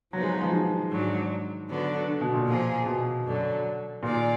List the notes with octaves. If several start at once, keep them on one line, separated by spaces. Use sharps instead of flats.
F3 F#3 B3 D#4
G#3
F3
D#3
G#2 F#3 D4
D3 F#3 B3 D4
D3
B2
A#2
F3 A#3 F4 G#4
B2
F#2 D3 F#3
A#2 D#3 A#3 F4 G#4 D5